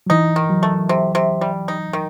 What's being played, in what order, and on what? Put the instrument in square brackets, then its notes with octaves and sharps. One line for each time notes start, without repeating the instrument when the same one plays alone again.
[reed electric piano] F#3
[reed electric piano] E3 [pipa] D#4
[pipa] D#3
[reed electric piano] F#3
[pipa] A3
C3
C3
G3
D#4
D#3